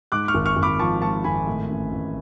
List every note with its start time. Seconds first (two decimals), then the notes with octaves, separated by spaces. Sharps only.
0.12 G#2 D6 F#6
0.28 C#6 F6
0.34 G#1
0.46 C#6 F6
0.56 G#1
0.62 B5 D6
0.79 F3 A5 C#6
1.02 G#2 A5 C#6
1.24 G#1 G#5 B5
1.47 A2
1.70 A1
1.92 A1